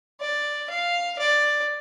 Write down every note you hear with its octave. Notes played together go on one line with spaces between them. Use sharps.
D5
F5
D5